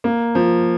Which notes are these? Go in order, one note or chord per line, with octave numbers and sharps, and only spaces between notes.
A#3
F3